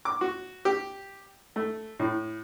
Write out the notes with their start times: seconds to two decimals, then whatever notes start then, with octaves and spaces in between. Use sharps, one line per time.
0.05 D6
0.21 F#4
0.65 G4
1.56 A3
2.00 A2